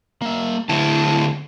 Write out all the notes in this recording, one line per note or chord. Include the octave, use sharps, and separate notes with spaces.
A#3 E5
D2 E4 A5